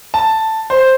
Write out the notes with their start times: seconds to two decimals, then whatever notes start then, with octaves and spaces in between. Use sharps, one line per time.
0.14 A5
0.70 C5